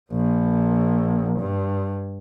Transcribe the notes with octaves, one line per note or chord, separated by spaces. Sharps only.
A#1
G2